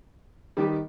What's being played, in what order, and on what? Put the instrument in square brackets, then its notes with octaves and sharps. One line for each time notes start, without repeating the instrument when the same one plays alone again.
[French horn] D#3 [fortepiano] G3 B3 G4